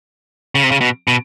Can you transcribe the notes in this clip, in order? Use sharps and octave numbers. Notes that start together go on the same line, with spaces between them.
C#3
C3
C#3
B2
B2